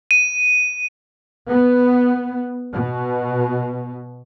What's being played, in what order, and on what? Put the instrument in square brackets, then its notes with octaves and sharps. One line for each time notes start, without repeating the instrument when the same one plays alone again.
[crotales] D#7
[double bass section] B3
B2